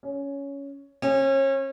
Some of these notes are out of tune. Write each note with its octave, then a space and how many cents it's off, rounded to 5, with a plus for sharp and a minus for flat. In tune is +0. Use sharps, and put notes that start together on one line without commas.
C#4 +10
C#4 -35